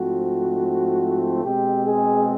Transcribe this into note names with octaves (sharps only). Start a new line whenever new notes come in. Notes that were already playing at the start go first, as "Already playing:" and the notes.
Already playing: G#2 F3 A3 C4 F#4
B2 G#3 C4 G4
G#4